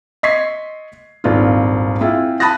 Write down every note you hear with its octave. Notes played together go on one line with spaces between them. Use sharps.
D#5 C6 C#6 G#6 B6 C7
D#1 G#1 D4 F4
C4 E4 F4 G#4
A5 B5 D#6 F#6 A6 A#6